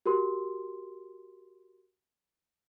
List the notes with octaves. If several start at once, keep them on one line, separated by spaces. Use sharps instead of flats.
F#4 G4 A#4 C6